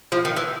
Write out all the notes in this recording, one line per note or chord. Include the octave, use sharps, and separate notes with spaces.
F3
D#3
E3